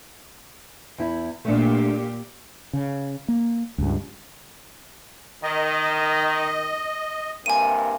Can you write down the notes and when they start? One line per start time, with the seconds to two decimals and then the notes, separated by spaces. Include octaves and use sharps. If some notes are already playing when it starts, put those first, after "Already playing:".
0.98 E2 E4
1.45 A#2 A3 D4 G4
2.73 C#3
3.28 A#3
3.78 C#2 G2
5.43 D#3 D#5
7.46 G2 C3 A#3 G#5 D#7